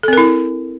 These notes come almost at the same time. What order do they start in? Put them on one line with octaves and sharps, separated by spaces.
A4 C4 A#4 E4